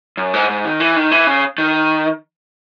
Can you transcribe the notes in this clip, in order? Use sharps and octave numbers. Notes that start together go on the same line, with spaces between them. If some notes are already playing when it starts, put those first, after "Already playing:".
F#2
G#2
G#2
D#3
E3
D#3
E3
C#3
D#3